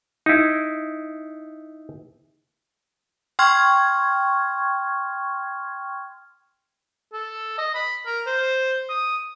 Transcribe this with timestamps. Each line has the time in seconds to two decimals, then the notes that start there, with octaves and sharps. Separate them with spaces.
0.26 D#4 E4
3.39 G5 C6 C#6 F6 G#6
7.13 A4
7.58 D#5
7.75 B5
8.06 A#4
8.27 C5
8.90 D#6